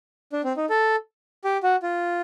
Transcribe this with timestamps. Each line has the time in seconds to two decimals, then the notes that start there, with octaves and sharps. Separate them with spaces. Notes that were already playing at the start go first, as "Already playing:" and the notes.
0.33 D4
0.44 C4
0.57 D#4
0.69 A4
1.44 G4
1.63 F#4
1.82 F4